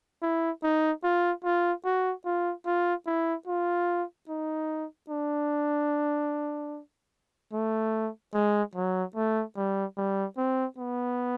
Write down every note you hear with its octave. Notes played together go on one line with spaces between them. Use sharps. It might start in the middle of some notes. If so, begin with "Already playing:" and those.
E4
D#4
F4
F4
F#4
F4
F4
E4
F4
D#4
D4
A3
G#3
F#3
A3
G3
G3
C4
B3